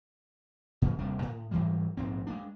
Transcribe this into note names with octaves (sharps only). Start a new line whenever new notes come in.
A#2 C#3 F3
D#1 C3 G3 D4
A2
G#2 E3 F#3 G3
A#1 G#2 C4
G#3 A#3 D4